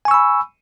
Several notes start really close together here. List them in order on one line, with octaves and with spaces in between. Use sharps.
G#5 C#6 E6 B5